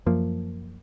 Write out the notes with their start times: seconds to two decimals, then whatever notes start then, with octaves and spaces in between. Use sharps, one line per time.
0.06 F#2 F3 A#3